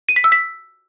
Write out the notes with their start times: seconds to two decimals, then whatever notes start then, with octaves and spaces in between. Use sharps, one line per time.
0.09 D#7
0.16 B6
0.24 E6
0.32 B6